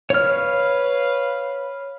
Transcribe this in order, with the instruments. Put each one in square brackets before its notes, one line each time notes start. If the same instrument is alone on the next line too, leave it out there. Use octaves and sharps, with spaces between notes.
[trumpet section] B4 F5 [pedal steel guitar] C#5 F6